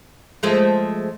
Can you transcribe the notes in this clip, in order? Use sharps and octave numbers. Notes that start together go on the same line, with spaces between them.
F3 G#3 A3